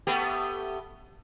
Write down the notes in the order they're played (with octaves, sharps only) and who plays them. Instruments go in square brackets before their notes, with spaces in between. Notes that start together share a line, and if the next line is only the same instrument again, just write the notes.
[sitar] A3 B3 G4